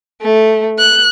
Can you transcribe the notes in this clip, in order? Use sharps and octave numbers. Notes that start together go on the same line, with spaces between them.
A3
F#6